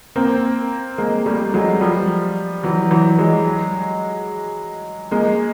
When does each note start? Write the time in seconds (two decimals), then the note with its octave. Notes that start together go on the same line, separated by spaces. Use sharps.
0.16 A#3 C4
0.98 G#3 A#3
1.26 G3 A3
1.54 F#3 G#3
1.81 F3 G3
2.63 E3 F#3
2.91 E3 F#3
3.18 F#3 G#3
5.11 G#3 A#3